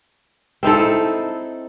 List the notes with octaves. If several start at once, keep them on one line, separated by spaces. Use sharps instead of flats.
C4 D#4 E4 A4